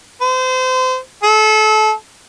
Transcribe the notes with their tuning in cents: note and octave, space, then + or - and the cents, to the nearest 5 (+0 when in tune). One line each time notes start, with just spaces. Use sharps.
C5 -30
A4 -30